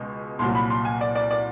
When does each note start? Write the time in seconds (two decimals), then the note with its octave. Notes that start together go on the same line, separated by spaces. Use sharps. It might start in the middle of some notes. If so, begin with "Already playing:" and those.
Already playing: C#2 B2 G#3
0.39 C2 A#2 F#3 C6
0.55 B5
0.70 C6
0.85 G#5
1.01 D5
1.16 D5
1.31 D5